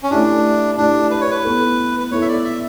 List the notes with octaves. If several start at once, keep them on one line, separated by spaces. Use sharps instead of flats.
C#4
A3 D4 E4 G4
A3 D4 E4 G4
B4
C#5
B4
B3 E4 A4
B4
B3 E4 A4 C#5
E5
D5
E5